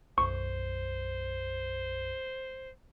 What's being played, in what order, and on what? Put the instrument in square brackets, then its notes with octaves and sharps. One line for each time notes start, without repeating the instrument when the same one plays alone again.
[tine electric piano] B1 F#2 [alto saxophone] C5 [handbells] C#6